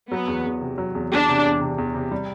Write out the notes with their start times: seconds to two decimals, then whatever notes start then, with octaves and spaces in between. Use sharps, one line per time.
0.12 F#3 B3
0.28 E2
0.46 E2
0.61 C3
0.78 F#3
0.95 E2
1.12 E2 D4
1.28 C3
1.45 E2
1.61 C3
1.78 E2
1.94 C3
2.12 G3